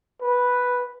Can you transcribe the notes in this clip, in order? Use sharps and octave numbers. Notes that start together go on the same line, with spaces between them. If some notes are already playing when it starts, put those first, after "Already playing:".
B4